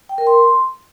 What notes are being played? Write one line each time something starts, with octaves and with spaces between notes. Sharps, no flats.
G5
A#4
C6